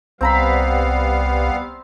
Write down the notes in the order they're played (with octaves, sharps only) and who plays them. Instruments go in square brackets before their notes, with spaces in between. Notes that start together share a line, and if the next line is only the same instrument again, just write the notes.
[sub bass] C2 [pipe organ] G3 B3 F5 [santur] C4 A#5 B5